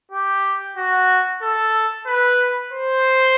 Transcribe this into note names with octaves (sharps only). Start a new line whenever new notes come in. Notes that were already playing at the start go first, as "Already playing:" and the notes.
G4
F#4
A4
B4
C5